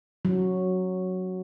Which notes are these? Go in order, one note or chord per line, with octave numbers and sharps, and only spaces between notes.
F#3